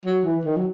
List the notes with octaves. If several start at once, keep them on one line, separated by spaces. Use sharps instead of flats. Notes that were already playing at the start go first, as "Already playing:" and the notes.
F#3
E3
D#3
F#3